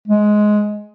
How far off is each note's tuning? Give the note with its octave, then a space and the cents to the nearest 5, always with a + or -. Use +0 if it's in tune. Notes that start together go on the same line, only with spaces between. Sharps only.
G#3 +15